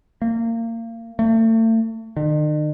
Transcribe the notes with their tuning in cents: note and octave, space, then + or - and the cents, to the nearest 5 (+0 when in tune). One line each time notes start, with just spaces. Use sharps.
A#3 -30
A3 +40
D#3 -45